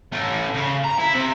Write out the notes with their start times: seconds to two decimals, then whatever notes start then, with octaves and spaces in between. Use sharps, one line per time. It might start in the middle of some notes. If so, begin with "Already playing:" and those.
0.12 A3 C#4
0.54 C#3
0.84 A#5
0.99 E4
1.14 C3